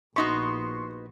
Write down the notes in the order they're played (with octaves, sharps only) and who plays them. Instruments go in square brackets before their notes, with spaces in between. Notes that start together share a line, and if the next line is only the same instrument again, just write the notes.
[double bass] A#1 [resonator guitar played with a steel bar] B3 D#4 F#4 [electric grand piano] C6 C#6